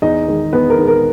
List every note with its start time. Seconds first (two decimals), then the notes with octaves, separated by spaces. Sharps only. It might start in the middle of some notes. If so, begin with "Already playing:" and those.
0.02 E2 D#4 D#5
0.28 D#3 G#3
0.53 E2 B3 B4
0.70 A#4
0.78 D#3 G#3
0.87 A#4